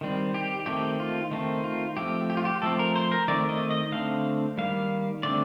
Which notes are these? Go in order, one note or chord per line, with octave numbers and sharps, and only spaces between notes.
D#3 G3 C4
G4
D#3 A3 C4 G4
F4
D#3 A3 C4
F4
F3 A3 C4 G4
G4
F4
G4
F3 A3 C4 A4
A#4
C5
A#4
D#3 A3 C4 D5
D#5
D#5
D3 A3 C4 F5
D#3 G3 A#3 F5
D3 A3 C4 D5